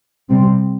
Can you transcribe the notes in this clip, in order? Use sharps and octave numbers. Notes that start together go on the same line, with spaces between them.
C3 G3 C4